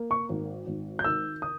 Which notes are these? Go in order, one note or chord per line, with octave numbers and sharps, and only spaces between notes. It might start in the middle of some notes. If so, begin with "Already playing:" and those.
Already playing: A#3
C#6
G#1
G#1
G6
D#3 E6
D#6